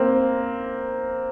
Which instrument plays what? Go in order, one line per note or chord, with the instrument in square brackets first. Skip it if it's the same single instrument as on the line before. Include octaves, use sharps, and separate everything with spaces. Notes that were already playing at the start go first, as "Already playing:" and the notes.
Already playing: [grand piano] A#3 C4